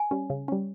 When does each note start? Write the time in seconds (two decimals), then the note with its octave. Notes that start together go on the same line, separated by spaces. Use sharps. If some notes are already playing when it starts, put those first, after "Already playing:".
Already playing: G#5
0.11 G3 C#4
0.30 C#3
0.48 G3 C#4